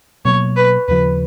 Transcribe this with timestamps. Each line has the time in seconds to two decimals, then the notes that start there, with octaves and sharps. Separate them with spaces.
0.25 B2 F#3 A#3 C#5
0.56 B4
0.88 D#2 C#3 F3 B4